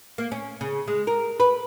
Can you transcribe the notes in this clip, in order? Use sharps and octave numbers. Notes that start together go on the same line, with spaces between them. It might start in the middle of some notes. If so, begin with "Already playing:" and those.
A#3
C#4
C#3
G#3
A#4
B4